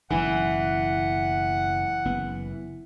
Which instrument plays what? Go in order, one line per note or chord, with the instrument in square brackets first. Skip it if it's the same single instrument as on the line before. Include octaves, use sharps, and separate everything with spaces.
[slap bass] F#1 B2 [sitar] E3 [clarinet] F#5
[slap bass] F#1 B3